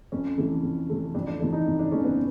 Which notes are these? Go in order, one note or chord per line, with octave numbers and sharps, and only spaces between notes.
F2 C#4
C3 E3 A3
F2
C3 E3 A3
F2 D4
D4
C3 E3 A3 D4
D#4
F2
D4
C3 E3 A3 C#4
B3